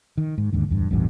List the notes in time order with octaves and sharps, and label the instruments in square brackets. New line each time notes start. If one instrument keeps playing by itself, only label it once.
[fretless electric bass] D#3
G#2
D#2 G#2 D3
D1 E2 G2
A1 E2 G2 B2